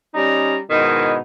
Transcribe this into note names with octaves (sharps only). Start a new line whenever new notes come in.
G3 C#4 D#4 D5 A#5
G#2 B2 D#3 D#4 E4